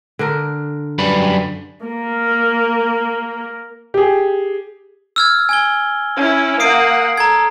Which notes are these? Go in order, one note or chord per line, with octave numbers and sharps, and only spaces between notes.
D3 D4 A#4
F#2 G3 B4
A#3 A#4
G4 G#4
E6 F6 G#6
G#5 G#6 G7
C#4 E4
A#3 F#5 D#6 C7 D7
A4 A#5 G#6